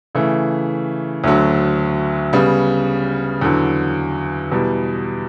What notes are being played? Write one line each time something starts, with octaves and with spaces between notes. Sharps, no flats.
C#3 E3 A3
D2 D3 F#3
C#3 G3 B3
E2 D3 F#3
E2 B2 G3